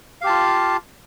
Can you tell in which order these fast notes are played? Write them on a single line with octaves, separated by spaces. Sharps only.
F5 G4 A5 F4